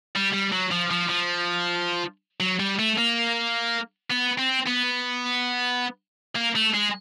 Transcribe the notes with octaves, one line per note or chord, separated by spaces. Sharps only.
G3
G3
F#3
F3
F3
F3
F#3
G3
A3
A#3
B3
C4
B3
A#3
A3
G#3